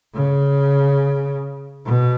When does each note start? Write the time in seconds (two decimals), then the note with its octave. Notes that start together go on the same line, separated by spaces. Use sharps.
0.15 C#3
1.86 B2